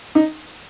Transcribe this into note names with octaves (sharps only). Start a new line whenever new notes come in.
D#4